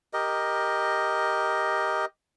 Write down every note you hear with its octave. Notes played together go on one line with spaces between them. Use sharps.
G4 A#4 D#5